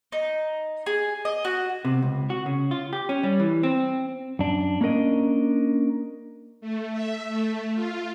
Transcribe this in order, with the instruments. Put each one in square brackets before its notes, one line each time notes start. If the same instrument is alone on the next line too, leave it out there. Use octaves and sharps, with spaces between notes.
[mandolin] D#4
G#4
D#5
F#4
[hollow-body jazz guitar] C3
C#2
F#4
C#3
F4
G4
C#4
G3
E3
C4
[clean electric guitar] F#2 D4
A#3 C#4 D4 A#4 D#5
[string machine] A3
E5
A3
F4